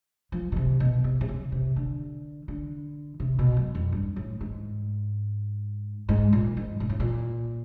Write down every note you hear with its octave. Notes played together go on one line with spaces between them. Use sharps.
F3
B2
C3
B2
C3
C3
C#3
C3
D3
D3
C3
B2
F#2
F2
G2
A2
G#2
G#2
A#2
G#2
A#2
A2
A#2